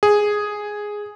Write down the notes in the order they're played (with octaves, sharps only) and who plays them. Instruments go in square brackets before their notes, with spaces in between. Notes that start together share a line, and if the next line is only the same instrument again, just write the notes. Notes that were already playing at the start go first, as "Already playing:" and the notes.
[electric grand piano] G#4